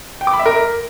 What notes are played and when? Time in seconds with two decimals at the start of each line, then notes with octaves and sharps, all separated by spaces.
0.21 G5
0.27 D6
0.33 B5
0.39 E5
0.46 A#4